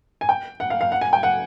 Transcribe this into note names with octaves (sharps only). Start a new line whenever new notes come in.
G#5
G5
F#5
F5
F5
F#5
G#5
G5
F#5